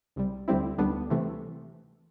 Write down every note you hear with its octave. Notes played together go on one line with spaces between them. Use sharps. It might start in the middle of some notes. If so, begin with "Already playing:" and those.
C2 C3 G3
D2 D3 G3 C4 E4
D2 D3 G3 B3 D4
C3 E3 A3